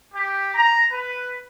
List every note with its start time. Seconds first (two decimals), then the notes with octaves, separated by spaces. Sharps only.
0.14 G4
0.55 A#5
0.92 B4